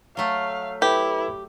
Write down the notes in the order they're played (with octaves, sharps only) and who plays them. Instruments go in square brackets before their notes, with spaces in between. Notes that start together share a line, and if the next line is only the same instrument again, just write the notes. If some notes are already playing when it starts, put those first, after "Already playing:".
[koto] F#3 A3 [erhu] F5
[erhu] E4 [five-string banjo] G4 [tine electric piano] A4 B4